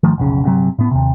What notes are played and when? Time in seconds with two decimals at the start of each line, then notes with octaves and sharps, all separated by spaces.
0.03 G#1 D#3 F3 A3
0.18 F1 B1 C#3
0.44 G1 C3 F#3
0.79 A2 B3
0.91 D#2 C3